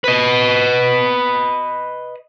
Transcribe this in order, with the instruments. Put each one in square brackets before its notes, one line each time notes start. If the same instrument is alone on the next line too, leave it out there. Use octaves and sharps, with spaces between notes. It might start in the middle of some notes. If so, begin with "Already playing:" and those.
[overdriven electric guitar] B4 D#5